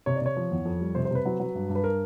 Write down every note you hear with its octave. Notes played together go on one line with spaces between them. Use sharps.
C3 C#5
D5
C3 C#5
F3
E2
F2
G3
C3 C5
C5
C3 B4
F#3
F#3
G2
G2
B4
A#4